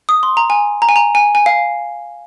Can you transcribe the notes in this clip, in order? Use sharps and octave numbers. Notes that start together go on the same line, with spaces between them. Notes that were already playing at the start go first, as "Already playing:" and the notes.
D#6
C6
A#5
G#5
A#5
G#5
A#5
G#5
G#5
F5